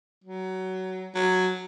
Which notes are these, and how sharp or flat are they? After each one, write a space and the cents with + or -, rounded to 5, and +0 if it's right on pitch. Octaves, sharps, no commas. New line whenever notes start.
F#3 +20
F#3 +0